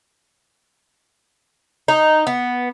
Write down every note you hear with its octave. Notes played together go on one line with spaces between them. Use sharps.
D#4
B3